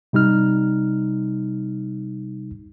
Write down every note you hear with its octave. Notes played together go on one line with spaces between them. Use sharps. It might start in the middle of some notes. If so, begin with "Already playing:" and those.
C3 G3 D#4 F6